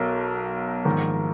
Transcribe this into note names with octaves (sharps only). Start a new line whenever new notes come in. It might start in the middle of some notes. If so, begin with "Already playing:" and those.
Already playing: B1 B2 A#4
A#1 G#2 D#3